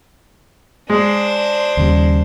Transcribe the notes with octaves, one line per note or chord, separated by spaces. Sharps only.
G#3 D4 C5
D#2 C#3 G3